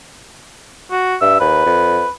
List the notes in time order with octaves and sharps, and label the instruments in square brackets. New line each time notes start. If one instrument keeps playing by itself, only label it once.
[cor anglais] F#4
[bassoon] G2 [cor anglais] E5
[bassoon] D#2 [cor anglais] B4
[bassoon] F2